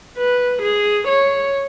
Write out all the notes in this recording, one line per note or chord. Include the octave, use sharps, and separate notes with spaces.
B4
G#4
C#5